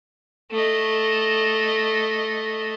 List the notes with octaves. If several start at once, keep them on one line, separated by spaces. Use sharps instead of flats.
A3 D#5